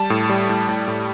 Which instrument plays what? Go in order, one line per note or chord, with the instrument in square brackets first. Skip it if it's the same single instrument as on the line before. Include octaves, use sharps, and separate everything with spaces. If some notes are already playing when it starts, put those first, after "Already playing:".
Already playing: [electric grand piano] G3 A5
A2
G3
A2
A2
A2